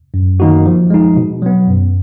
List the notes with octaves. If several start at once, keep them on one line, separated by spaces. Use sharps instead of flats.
F#2
D#3 A#3 D#4 F#4
F3
G#3 D#4
B2
F#3 B3
F#2